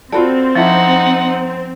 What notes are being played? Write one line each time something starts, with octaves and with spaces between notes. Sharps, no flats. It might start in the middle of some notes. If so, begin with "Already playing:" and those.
C4 F4 F#4 A4 D5 B5
F3 C#4 D#4 E4 A4 F#5